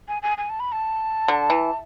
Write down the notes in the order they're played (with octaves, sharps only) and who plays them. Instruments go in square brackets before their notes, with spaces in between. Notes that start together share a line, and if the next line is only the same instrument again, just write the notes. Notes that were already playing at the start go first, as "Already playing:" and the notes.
[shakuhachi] G#5
G#5
G#5
A5
B5
A5
[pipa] D3
E3